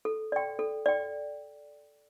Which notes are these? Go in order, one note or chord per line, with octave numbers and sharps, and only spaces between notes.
A4
D5 G5
A4
D5 G5